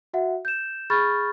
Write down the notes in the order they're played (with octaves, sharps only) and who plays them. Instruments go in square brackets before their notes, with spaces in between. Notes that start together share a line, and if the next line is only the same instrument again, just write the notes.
[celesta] F#4 E5 F#5
G6 E7
G#4 B5 C#6 F6 G6 A6